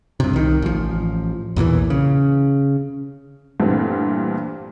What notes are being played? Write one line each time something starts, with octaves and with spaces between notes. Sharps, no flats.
G2 C3
C2 D#3
A1 F3
B1 E2 A#2 E3
C#3
G2 A#2 E3 A3 B3 C4